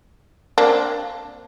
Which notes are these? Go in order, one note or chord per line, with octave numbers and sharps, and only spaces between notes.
A#3 C4 D4